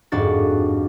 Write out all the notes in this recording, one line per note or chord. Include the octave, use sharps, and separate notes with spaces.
G1 F2 G#2 D4 F#4 A6